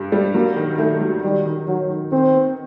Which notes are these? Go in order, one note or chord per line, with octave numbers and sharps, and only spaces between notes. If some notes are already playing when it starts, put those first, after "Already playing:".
Already playing: G2 G3
G3
F#3 A#3
D#3
D#3 A3
F#3
D#3 G3
D#3
D#3 F#3
D#3
D#3 C4
B3